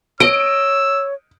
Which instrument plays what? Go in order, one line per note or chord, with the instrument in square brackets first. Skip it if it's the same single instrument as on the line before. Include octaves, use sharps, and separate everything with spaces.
[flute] C#5 [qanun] D#5 [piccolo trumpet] E6 [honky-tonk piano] D7